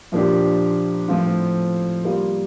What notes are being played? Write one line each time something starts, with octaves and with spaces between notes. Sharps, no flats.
A#2 F3 A#3 D4 G4
A2 F3 C4 F4
G3 A#3 F4